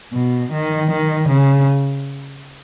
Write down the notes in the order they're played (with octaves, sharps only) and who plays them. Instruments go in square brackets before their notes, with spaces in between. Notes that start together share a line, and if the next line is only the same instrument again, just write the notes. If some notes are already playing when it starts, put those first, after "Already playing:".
[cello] B2
D#3
D#3
C#3